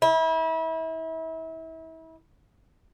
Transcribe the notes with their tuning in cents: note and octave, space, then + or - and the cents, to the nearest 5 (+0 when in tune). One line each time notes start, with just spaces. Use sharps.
E4 -35